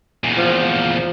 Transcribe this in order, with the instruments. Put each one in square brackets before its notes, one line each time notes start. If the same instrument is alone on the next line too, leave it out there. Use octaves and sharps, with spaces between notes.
[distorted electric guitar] E2 A#2
[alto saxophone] F3